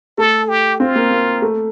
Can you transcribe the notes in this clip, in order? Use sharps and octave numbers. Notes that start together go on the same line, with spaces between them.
A3 A4
G4
C4 F4
A#3
A#3
A3